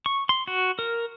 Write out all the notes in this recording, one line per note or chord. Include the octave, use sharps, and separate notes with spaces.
C#6
C6
F#4
A#4